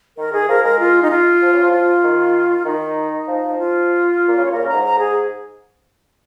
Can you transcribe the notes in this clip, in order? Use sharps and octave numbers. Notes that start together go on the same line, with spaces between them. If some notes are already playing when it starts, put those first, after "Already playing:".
D#3 A#4
D#3 G#4
F3 A#4
G#3 A#4
F4
D#4
F4
F3
C#3
F3
F4
D#3
D#3 D#4
F3
F3
F4
A#2
C#3
C#5
A#2 A#4
C#3
A#5
G#2
A#5
G#4